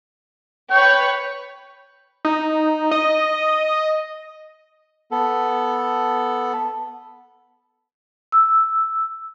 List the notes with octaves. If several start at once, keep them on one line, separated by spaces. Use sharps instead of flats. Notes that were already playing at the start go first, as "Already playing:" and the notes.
B4 C#5 G5 C#6
D#4
D#5
B3 A4
E6